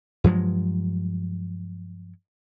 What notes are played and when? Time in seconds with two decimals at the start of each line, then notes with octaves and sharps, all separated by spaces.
0.24 G2 F3 F#3 G#3